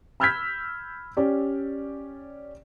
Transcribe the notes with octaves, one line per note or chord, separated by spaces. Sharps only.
B5 E6 F6 G6 G#6 B6
C#4 G4 D5